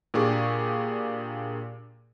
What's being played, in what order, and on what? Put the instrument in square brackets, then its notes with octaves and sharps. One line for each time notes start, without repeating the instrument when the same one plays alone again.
[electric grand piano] A#2 D4 G4 G#4 C#6 D6